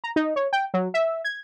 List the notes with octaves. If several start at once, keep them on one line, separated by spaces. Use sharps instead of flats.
A#5
D#4
C#5
G5
F#3
E5
G#6